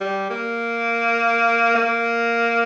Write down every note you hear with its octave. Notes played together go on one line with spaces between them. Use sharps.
G3
A#3
A#3